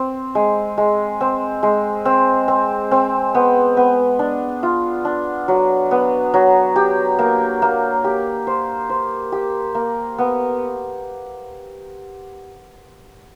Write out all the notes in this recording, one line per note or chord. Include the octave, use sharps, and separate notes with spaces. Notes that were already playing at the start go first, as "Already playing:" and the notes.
Already playing: C4
G#3
G#3
C4
G#3
C4
C4
C4
B3
B3
D4
F4
D4
F#3
B3
F#3
G4
A#3
A#3
G4
C5
C5
G4
A#3
B3